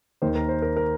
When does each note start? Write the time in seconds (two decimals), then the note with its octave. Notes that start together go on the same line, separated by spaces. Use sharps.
0.22 D#2 D#3 C5
0.35 A#4
0.49 C5
0.62 A#4
0.77 A#4